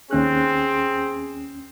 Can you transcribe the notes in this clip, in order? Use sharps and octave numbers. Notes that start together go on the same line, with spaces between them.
D#2 C4 C#4 G#4 F#6